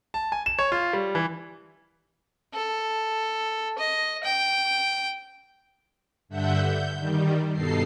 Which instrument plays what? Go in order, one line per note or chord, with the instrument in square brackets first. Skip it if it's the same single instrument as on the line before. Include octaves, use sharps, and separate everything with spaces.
[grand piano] A5
G#5
E7
C#5
F4
G3
E3
[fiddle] A4
D#5
G5
[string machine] G2 D3 E5 F#5 G6
G6
D#3 G3
G2 B2 D#4 A4 C7